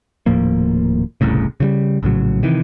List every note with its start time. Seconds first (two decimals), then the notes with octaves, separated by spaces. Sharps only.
0.26 D#1 A2 F3 A#3
1.21 E1 C2 A2 C#3
1.60 C#3 F3 G3
2.03 A#1 A2 C#3 F#3
2.43 C3 D#3 E3